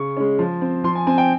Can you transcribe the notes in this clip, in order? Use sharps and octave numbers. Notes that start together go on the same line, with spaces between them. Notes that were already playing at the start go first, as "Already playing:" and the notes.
Already playing: C#3 C#6
G#3 C#4
F3
C4
F3 C6
G#5
C4 G#5
G5